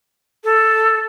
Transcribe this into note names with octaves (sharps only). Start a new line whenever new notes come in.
A4